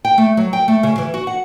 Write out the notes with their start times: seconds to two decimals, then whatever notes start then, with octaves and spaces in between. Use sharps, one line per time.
0.05 G5
0.18 A3
0.37 F#3
0.53 G5
0.68 A3
0.83 C#3
0.98 E3
1.14 F#4
1.27 F#5